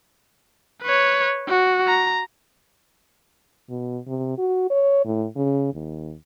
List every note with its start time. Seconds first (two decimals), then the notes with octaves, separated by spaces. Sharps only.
0.83 B4 C#5
1.48 F#4
1.87 A#5
3.69 B2
4.07 C3
4.38 F#4
4.70 C#5
5.05 A2
5.36 C#3
5.74 D#2